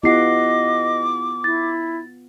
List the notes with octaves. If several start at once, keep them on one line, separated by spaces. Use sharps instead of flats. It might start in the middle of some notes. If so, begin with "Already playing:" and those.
B3 E4 F4 G4 D#5 F#5 D6 C7
E4 A6